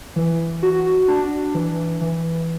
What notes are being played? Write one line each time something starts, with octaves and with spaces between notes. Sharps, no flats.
E3
F#4
D4
E3
E3